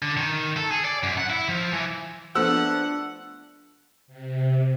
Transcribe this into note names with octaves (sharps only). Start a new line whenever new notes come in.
D3
D#3
A4
G#4
D5
F#2
F#5
E4
F3
E3
F3 A3 B3 D4 F#5 E6
C3